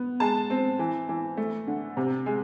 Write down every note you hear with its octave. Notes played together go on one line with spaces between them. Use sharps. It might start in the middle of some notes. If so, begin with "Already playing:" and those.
Already playing: B3
G#3 A5
C4
E3
E3
A3
D3
C3
G#3